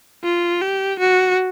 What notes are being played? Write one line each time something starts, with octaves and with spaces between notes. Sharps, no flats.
F4
G4
F#4